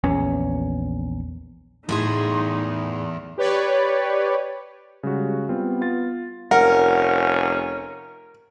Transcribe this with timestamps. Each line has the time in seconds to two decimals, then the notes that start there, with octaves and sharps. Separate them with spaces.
0.04 A#1 E2 C#4
1.89 E2 A2 D#4 E4 G#4 C6
3.38 G4 B4 C#5 D5
5.03 C#3 G3 G#3 F#4
5.49 G3 B3 C4 F4
5.81 F4 A6
6.51 F1 C#4 A#4 F#5